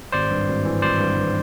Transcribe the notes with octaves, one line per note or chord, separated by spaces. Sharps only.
G#1 C5 D5
G2
G#1
E3
G#1 C5 D5
G2
G#1